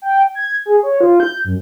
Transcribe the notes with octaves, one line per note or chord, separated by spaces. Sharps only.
G5
G#6
G#4
C#5
F4
G6
F#2